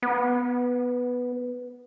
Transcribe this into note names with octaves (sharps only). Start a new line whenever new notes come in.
B3